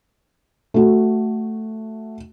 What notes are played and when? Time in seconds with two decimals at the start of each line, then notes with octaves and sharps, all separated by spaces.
0.74 A3 F#4